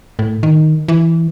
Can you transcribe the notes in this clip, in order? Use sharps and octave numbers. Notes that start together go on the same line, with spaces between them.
A2
D#3
E3